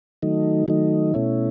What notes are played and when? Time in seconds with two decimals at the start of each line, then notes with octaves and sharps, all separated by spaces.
0.22 D#3 F#3 A3 D#4
0.68 D#3 F#3 A3 D#4
1.14 B2 A3 C#4 E4